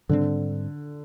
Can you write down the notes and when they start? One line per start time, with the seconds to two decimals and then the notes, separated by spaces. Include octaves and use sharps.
0.09 G#2 D3 G3 C4